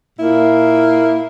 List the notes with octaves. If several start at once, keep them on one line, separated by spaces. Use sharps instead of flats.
A#2 A#3 E4